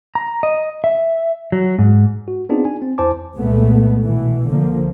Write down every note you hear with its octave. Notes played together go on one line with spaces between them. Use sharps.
A#5
D#5
E5
F#3
G#2
F#4
B3 C4 D4 D#4 F4 G#4
G#5
C4
E2 E4 C5 G#5 A5 D6
C2 A#2 G#3 A3 B3
B2 E3
C2 D3 F3 A#3